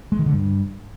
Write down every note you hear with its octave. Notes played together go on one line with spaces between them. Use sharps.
G#3
D#3
D3
G2